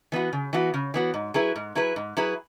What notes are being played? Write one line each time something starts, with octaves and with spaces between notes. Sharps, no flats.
E3 B3 F#4
C#3
E3 B3 F#4
C#3
E3 B3 F#4
G#2
F#3 E4 G#4 B4
G#2
F#3 E4 G#4 B4
G#2
F#3 E4 G#4 B4